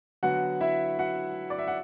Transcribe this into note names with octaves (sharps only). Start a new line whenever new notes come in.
D3 F#3 B3 F#4 F#5
E4 E5
F#4 F#5
D5
E5
F#5